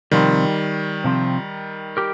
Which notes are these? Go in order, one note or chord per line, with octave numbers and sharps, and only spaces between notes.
C3 D#3 F3 G3 C4
C3 F3 C4
G4 A#4